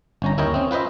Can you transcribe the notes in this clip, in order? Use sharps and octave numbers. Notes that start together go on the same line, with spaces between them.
G1 C#4 A#5
D#2 E4 A#4 C#5 D#5 G5
C4 C#4
F4 B4 C5 D#5 E5